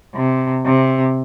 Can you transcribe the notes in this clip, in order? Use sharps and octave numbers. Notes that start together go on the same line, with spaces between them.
C3
C3